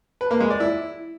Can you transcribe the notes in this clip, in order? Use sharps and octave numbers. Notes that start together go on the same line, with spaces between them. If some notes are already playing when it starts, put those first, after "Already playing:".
B4
A#3
G#3
D5
E4